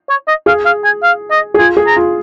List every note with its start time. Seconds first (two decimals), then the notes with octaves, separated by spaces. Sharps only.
0.09 C#5
0.28 D#5
0.46 G#4 F5
0.65 F5
0.84 G#5
1.03 F5
1.31 D#5
1.54 G#4
1.59 F4 G#5
1.77 G#4
1.87 A#5
1.96 F4